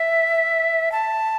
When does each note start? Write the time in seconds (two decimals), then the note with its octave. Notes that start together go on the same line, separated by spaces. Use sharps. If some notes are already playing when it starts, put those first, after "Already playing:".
Already playing: E5
0.92 A5